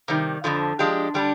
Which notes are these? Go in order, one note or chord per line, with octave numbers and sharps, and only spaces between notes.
C3 D#3 G3
F2 D3 F3
F3 G#3 D4 G4
D3 G3 D4 G4